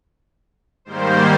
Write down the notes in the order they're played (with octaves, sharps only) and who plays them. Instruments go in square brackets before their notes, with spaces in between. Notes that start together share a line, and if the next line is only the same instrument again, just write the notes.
[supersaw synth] G#2 D#3 G3 A#3 C5